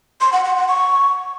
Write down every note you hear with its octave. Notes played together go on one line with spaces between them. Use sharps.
C6
F#5
F#5
F#5
C#6